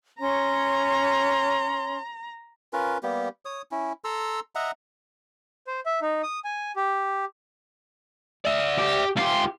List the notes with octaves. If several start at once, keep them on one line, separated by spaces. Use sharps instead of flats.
C#4 C#5 A#5 C6
C#4 F4 A#4 B4
G3 A#3 B3 G4
C#5 D#6
C#4 E4
A4 A#5 C6 E6
D#5 E5 F#5 A#5
C5
E5
D#4
D#6
G#5
G4
D5 E5
G4
C#2 F4 G4 C6